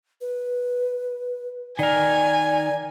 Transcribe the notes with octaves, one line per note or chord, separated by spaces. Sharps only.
B4
D#3 A#4 D5 G#5